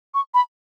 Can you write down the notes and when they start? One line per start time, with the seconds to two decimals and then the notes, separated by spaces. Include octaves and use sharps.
0.14 C#6
0.34 B5